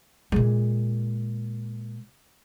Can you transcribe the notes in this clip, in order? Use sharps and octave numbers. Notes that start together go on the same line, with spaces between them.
A#2 G#3